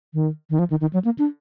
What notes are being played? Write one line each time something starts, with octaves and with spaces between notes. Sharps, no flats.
D#3
D#3
F3
D#3
D#3
F#3
A#3
D4